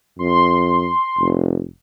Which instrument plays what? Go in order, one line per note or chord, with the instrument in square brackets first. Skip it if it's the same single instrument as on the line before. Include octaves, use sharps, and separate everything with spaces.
[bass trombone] F2 [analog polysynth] C6
[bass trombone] F1